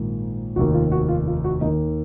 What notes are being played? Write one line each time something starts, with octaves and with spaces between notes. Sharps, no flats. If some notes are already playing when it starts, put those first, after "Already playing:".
Already playing: A#1 G#2 D#3
F1 D#2 D#3 F#4
F4
F#4
F4
F4
F#4
D#2 D#3 D#4